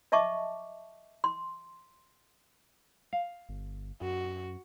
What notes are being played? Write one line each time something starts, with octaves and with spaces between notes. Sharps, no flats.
D#5 E5 A5 C#6 D6
C6
F5
G1
F#2 F#4